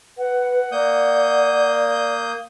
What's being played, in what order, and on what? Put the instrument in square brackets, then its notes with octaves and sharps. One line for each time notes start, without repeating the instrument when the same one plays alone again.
[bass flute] B4 [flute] F#5
[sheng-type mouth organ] A#3 D#6 G6 [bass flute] D5